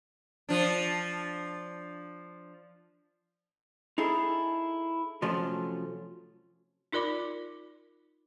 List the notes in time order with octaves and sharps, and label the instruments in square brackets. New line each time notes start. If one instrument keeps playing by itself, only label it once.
[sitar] F3 D4
[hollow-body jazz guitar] D#4 E4 G#4 A4
C3 F3 F#3 A3 C#4
[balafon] D#4 F4 A#4 D5 B5 D6